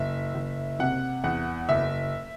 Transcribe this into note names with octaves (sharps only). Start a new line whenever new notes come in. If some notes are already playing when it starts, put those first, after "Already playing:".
Already playing: F#1 E5
F#1
C3 F#5
E2 F#5
F#1 E5